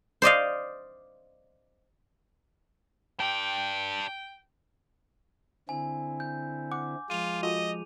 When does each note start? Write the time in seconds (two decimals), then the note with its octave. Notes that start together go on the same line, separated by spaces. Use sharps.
0.22 C5 D5 D#5 F5
3.20 D4 G4 G5
5.69 D3 C4 E4 G#5
6.20 G6
6.72 F#5 D6
7.10 F3 G#3 F4 D#7 F7
7.43 F4 F#4 A4 D#5